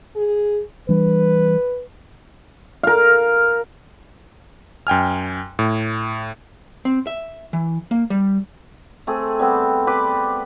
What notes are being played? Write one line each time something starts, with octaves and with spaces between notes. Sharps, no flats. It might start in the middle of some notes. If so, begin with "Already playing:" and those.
G#4
E3 G3 D4 B4
A#4 F5
F#2 G5 G#5 F6
A2
C4
E5
E3
A#3
G3
A3 C4 G#4
G3 B3 C4
G4 B4 D5 D6